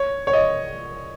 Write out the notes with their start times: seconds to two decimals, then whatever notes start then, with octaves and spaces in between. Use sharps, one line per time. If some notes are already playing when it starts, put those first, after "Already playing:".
Already playing: C#5
0.27 C#5
0.33 D#5